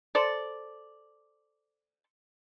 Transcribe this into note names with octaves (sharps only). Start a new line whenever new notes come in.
A4 C5 D5